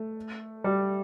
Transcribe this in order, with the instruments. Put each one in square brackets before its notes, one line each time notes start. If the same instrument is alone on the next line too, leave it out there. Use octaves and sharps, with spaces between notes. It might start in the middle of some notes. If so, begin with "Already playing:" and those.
Already playing: [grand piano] A3
G3